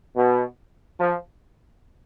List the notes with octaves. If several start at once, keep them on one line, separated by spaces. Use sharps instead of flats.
B2
F3